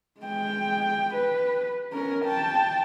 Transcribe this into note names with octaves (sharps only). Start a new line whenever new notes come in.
G#3 G5
B4
C#4 A#4
G5 A5